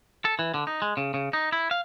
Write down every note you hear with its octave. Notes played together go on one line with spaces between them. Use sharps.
A4
E3
D3
D#4
G#3
C#3
C#3
D#4
E4
F5